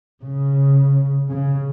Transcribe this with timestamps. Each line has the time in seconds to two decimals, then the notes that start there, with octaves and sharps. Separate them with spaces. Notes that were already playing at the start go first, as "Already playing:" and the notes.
0.24 C#3
1.30 C#3